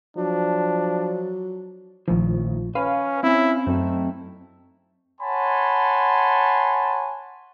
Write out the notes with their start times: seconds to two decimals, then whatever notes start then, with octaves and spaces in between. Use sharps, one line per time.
0.17 F3 F#3 D4
2.08 A#1 A2 D#3 F3
2.75 C#4 B4 F5
3.23 C4 C#4 E4
3.67 F#2 A3 C4 D#4
5.21 C#5 F#5 G#5 A5 B5 C6